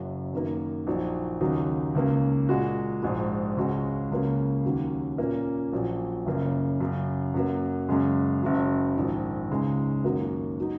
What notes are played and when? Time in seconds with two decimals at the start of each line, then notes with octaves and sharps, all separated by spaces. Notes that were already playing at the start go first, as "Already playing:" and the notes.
Already playing: F#1 F#2 C#3 F#3
0.33 F#2 D#3 A#3
0.87 A#1 A#2 F#3 D#4
1.41 D#2 C#3 F#3 D#4
1.95 C#2 C#3 A#3
2.49 A#2 G#3 F#4
3.02 A#1 G#2 G#3 F#4
3.57 C#2 C#3 G#3 F#4
4.10 C#2 C#3 A#3 F#4
4.65 D#2 D#3 F#3 C#4
5.18 A#2 A#3 C#4
5.73 A#1 A#2 F#3
6.26 F#1 F#2 C#3 A#3
6.80 F#2 C#3 F#3
7.34 F#2 F#3 A#3
7.89 F#2 C#3 G#3
8.42 F#1 F#2 C#3 F#3
8.96 A#1 G#2 D#3
9.51 C#2 C#3 G#3 D#4
10.04 F#2 D#3 F#3 A#3 F#4
10.60 F#3 D#4